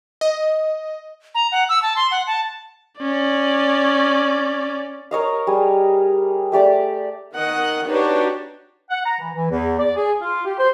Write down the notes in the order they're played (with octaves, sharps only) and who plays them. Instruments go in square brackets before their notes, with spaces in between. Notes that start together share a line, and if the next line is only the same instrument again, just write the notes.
[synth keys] D#5
[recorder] A#5
F#5
E6
A5
C6
F#5
A5
[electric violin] C#4 D5
[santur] A#4 C#5 D#5 F5
G3 G#4
A3 G4 D5 D6
[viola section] D#3 A#4 D#5 F#5
D4 D#4 F#4 G4 B4 C#5
[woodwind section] F#5
A#5
E3
E3
E2
D5
G#4
F4
G4
C5